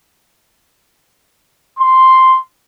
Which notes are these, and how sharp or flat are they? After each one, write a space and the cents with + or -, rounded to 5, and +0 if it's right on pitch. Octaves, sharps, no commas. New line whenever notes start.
C6 +0